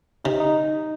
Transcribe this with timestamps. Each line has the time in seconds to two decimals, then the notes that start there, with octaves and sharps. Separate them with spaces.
0.24 C3 D#4
0.40 D#4